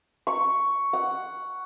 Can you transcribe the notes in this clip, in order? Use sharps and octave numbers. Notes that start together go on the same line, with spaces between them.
C#6
F#5